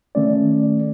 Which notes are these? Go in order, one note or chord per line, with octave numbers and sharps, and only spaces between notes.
D#3 A3 C#4 D5